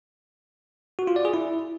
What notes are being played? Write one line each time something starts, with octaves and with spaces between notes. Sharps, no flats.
F#4
F4
D5
G#4
E4